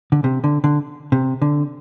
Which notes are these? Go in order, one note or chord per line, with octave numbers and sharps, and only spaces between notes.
D3
C3
D3
D3
C3
D3